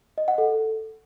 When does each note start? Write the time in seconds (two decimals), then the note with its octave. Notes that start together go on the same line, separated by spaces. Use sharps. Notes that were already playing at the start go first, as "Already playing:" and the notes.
0.18 D#5
0.28 F#5
0.38 A4